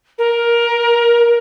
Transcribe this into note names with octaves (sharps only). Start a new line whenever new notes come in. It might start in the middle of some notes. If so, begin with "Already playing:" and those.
A#4